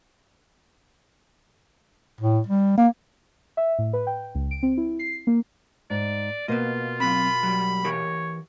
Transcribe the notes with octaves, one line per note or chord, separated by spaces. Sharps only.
A2
G3
A#3
E5
A2
B4
G5
C#2
D7
C4
E4
C7
A#3
G#2 D5
B2 A#3 F4 B4 C5 D#5
F#3 C4 B5
F#3 G3
E3 G4 A#4 C#5